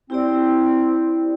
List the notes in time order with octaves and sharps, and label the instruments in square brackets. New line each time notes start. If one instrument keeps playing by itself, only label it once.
[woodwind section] C4 [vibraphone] E4 G4 D5